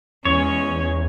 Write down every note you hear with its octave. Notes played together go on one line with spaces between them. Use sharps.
E2 G#3 C#4 C#5